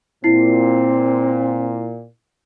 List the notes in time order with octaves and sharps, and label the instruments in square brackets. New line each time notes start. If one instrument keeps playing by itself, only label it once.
[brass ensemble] A#2 [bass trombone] C4 [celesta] E4 C7